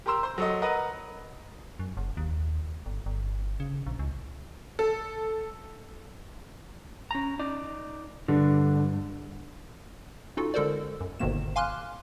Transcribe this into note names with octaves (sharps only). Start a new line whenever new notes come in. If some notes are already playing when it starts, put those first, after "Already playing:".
G4 A#4 A#5 C6 E6
C5 C6
F#3 A4 D#5
A#4 B4 D#5 F#5 A#5
F#2
F#1
D#2
G1
G1
C#3
A#1
C#2
A4
C#4 A#5
D#4 D5
G2 D3
C#4 D#4 F4 F#4 A4
D3 G#3 A4 A#4 C5 D5
F#2
G1 G#2 B2 D#3 A#3 E7
F5 G#5 C6 D6 F6 F#6